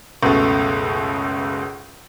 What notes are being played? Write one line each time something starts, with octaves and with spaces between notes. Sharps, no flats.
C#2 F#2 B2 A3